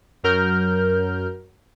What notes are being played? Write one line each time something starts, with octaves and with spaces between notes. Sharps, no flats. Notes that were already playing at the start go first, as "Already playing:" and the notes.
F#2 F#3 A#4 F6 G6